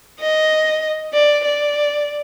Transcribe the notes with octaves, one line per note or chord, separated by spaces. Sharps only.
D#5
D5
D5